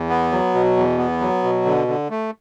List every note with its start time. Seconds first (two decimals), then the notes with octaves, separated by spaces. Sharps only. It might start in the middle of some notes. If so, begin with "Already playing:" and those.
Already playing: E2
0.09 B3
0.32 F#3
0.54 B2
0.77 E2
0.98 B3
1.21 F#3
1.43 B2
1.65 D3
1.88 D3
2.10 A3